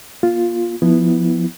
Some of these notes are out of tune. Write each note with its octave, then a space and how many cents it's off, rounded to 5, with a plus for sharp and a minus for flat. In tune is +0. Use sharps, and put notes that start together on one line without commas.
A#3 +30 F4 +0
F3 +0 B3 +0 E4 -5